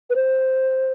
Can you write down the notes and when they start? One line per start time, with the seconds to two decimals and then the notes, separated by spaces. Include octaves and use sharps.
0.10 B4
0.15 C5